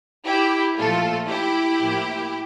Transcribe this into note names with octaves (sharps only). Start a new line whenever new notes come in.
E4 G4
A#2 F3 A3 F4 A4
E4 G4
A2 F3 A#3